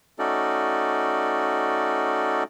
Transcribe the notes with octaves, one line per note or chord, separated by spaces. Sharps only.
A3 C#4 D#4 F#4 A4 D5